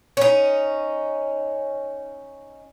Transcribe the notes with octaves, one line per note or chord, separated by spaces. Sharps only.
C#4 D#4